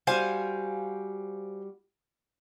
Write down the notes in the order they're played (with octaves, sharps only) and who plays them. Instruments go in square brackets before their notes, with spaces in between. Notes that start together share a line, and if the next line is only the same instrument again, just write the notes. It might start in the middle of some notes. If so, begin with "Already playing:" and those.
[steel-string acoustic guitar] G3 F#4 [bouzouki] C5 F5 G#5